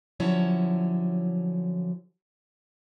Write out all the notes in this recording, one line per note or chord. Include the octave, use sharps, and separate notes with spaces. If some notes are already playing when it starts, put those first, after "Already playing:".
D3 F3 F#3 C#4 E4 C#5